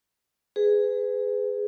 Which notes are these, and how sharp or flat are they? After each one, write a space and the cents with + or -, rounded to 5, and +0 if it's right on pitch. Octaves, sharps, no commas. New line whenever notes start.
G#4 +0 B4 +30